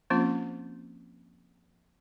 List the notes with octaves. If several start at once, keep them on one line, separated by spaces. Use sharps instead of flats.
F3 A#3 C4 C#4 F4